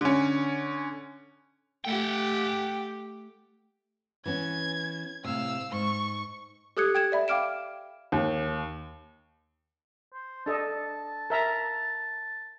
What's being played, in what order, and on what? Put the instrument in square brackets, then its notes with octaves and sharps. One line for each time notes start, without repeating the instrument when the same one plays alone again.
[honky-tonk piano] D3 C#4
[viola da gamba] A3 G4 [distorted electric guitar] F#5 G5
[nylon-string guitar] E3 B3 C#4 [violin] G#6
[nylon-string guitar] A2 C3 [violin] F5 E6
[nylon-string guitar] G#2 [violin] C#6
[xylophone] G4 A4 D#6 F#6 G#6 C#7
G5 G#6 E7
D5 E5 B5
F5 G5 D6 F6 D7 E7
[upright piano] D#2
[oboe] C5
[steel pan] D4 A4 D#5 [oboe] A5
[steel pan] A#4 E5 A#5